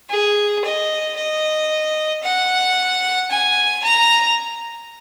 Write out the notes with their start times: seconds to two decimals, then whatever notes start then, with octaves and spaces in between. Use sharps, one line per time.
0.10 G#4
0.65 D#5
1.17 D#5
2.24 F#5
3.31 G#5
3.84 A#5